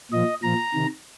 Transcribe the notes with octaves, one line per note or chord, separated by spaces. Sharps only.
A#2 F3 D#5
A#2 F3 A#5
C3 D#3